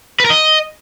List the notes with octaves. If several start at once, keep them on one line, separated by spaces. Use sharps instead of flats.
B4
A#4
D#5